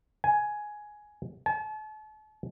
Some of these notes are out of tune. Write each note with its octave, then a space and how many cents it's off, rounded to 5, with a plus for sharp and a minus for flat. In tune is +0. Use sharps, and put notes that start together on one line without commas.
G#5 +10
A5 -40